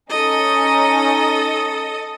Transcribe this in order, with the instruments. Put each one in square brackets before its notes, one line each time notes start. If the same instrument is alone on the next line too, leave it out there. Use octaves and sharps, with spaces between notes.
[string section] C#4 D#4 [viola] A4 D#5